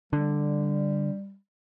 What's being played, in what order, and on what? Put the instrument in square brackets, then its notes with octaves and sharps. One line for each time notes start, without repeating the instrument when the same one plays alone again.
[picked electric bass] D3 [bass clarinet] G3